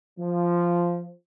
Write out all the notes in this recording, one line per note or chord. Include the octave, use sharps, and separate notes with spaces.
F3